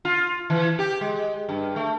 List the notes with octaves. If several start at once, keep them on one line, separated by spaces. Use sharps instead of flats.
F4
E3
G4
G#3
G2
A3